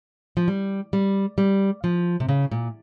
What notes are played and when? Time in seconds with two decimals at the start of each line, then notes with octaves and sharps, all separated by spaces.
0.37 F3
0.48 G3
0.93 G3
1.38 G3
1.84 F3
2.20 C3
2.29 C#3
2.51 A#2